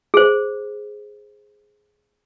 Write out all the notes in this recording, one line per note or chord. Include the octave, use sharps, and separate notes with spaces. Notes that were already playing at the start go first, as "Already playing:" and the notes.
G#4 C5